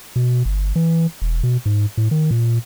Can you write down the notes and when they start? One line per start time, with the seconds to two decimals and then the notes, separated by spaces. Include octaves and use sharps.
0.16 B2
0.45 G1
0.76 E3
1.22 E1
1.43 B2
1.66 G#2
1.98 A2
2.11 D#3
2.31 A#2